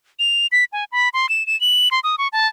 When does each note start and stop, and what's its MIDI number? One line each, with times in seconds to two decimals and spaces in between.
0.19 0.47 101
0.52 0.64 95
0.73 0.84 80
0.92 1.09 83
1.14 1.29 84
1.29 1.46 100
1.47 1.59 100
1.61 1.89 102
1.91 2.00 84
2.04 2.16 87
2.18 2.28 85
2.33 2.47 81